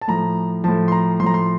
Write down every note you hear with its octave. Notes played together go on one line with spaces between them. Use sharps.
A5
A2 F3 A#5
A2 F3 A5
C6
A#5
A2 F3 A#5 C6
C6